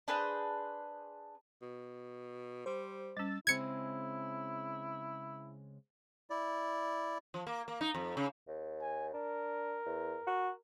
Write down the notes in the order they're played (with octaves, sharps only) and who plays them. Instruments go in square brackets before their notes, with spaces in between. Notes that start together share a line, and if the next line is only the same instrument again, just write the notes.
[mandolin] D4 G#4 B4 C5
[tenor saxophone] B2
[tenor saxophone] G3 [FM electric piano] C5
[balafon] G3 C#4 [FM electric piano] E6 A6
[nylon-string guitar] C#3 G#3 C4 [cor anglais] E4 [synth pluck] G#6 C#7
[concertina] E4 D5
[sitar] F3
A#3
A#3
D#4
F2
C#3
[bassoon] D#2
[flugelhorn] G#5
[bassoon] D4 [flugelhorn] A#4
[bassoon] E2
F#4